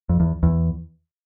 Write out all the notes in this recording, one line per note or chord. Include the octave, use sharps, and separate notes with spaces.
F2
E2
E2